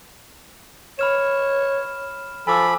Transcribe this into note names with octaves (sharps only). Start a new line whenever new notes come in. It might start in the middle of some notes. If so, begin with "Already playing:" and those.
C#5 B5 F6 E7
F3 A4 G#5 B5 D6 E6